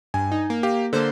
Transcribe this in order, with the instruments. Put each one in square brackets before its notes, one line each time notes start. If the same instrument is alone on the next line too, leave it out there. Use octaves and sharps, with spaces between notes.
[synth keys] G2 [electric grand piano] G#5
[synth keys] D#4
A#3
[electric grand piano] G4 F5
[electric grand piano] D3 A#3 [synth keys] A4 C5